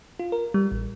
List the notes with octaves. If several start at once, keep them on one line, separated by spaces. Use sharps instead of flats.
F4
A#4
G3
A1